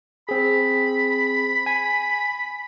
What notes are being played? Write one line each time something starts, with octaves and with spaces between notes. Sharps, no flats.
C4 G#4 B5
G#5